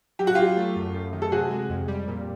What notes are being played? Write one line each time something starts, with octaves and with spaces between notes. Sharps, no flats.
F#3 G4
F#4
F#3 F4 G4
A3
F#2
F#2
D#3
A4
C3 F#4 G#4
G#3
F2
G3
A#2